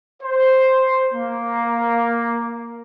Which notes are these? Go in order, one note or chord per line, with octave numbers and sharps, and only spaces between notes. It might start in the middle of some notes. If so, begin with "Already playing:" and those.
C5
A#3